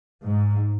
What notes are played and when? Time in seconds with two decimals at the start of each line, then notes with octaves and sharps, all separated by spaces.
0.23 G#2